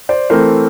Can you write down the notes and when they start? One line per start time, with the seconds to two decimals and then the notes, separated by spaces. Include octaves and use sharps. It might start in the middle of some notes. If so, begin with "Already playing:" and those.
0.09 C5 D5
0.30 E3 A3 C4 A#4 C5